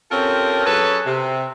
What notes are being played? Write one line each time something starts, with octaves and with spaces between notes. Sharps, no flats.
C4 C#4 F4 G4 A4 A#4
F#3 C#4 G#4 A4 B4
C3